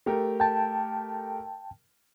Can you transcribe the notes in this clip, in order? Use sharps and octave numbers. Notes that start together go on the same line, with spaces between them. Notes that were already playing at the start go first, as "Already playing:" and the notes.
A3 G4 A#4
G5 A5